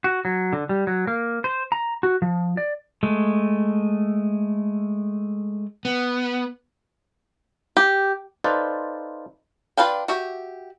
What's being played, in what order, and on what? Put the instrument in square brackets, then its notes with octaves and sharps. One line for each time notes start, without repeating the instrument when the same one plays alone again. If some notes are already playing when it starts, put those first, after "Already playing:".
[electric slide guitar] F#4
F#3
D3
G3
F#3
A#3
C5
A#5
F#4
F3
D5
[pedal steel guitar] G#3 A3
[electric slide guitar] B3
[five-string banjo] G4
[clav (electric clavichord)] D#4 F4 A4 B4 C5 D5
[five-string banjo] D4 F4 B4 F5 G5
F#4 G4 E5